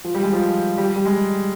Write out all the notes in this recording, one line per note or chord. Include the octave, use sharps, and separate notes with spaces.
F3
G3
G#3
F3
G3
G3
G#3